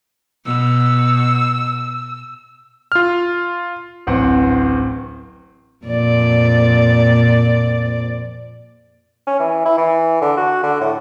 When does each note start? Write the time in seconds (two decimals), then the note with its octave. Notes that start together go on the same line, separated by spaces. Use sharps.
0.46 B2 E6
2.92 F4 F6
4.07 D1 A1 C4 F#5
5.86 F2 A#2 D5
9.27 C#4
9.40 E3
9.65 E4
9.78 E3
10.21 D3
10.37 F#4
10.63 D3
10.81 A2